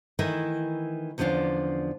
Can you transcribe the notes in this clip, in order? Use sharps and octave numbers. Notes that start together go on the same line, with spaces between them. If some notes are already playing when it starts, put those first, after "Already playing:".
D#3 E3 A3 E4 A#4
E2 D3 F3 C#4 D4 F4